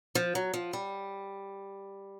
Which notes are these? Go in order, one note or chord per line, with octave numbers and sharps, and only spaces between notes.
F3
F#3
F3
G3